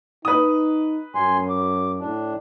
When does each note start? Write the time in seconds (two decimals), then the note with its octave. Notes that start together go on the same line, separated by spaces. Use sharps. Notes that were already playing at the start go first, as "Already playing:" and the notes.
0.25 D#4 B4 D#6
1.15 F#2 G#5 C6
1.49 D6
2.00 A2 D4